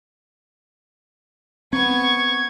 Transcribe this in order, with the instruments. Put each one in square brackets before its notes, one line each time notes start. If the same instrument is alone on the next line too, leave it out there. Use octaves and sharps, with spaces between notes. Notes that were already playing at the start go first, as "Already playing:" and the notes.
[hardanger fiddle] B3 C#6 [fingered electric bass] C4 [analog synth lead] G#6